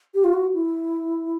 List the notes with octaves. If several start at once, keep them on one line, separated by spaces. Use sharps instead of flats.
G4
F4
F#4
E4